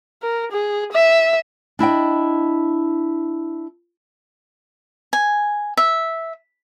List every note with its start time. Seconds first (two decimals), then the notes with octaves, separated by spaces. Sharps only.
0.22 A#4
0.52 G#4
0.92 E5
1.79 D4 E4 D#5 G5
5.13 G#5
5.77 E5